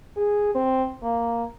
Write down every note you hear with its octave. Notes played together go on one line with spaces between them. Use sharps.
G#4
C4
A#3